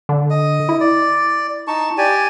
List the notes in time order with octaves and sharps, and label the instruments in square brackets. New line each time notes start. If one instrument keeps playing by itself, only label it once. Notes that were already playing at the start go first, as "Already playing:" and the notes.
[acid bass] D3
[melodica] D#5
[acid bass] E4
[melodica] D5
D#4 A5 C#6
G4 D5 G#5